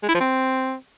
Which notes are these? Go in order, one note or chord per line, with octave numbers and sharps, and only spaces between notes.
G#3
E4
F3
C4